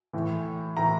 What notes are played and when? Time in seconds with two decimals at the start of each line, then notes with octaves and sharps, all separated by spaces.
0.13 A2 E3
0.77 A2 E3 A#5